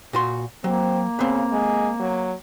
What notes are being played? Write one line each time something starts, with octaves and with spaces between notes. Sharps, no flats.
A#2 F#4 C6
F#3 A#3 C4
C#3 B3 C4
G#3
F#3